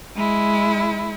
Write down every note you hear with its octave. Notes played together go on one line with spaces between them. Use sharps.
G#3 E4